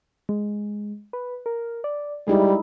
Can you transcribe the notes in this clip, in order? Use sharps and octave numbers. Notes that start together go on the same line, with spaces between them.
G#3
B4
A#4
D5
G3 G#3 D#4 E4 G#4